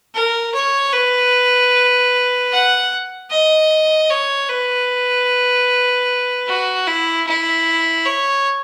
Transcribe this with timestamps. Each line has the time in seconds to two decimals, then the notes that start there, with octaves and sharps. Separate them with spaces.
0.15 A#4
0.54 C#5
0.93 B4
2.52 F#5
3.31 D#5
4.10 C#5
4.49 B4
6.47 F#4
6.87 E4
7.27 E4
8.05 C#5